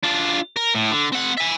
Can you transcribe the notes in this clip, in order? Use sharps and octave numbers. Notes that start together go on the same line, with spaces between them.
D4 F4
A#4
A2
D3
C4 F#5
E5 G#5